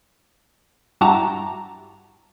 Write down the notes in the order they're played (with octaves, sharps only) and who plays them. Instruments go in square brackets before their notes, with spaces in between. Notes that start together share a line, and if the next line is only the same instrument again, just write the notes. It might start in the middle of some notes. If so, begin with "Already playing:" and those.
[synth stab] G2 E4 F#4 G4 A5 A#5